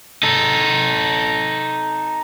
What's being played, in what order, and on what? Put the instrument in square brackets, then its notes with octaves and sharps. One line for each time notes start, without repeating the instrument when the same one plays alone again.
[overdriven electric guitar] D#4 A4